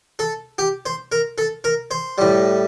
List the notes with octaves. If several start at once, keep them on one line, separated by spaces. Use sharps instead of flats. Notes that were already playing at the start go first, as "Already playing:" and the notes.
A4
G4
C5
A#4
A4
A#4
C5
A2 G3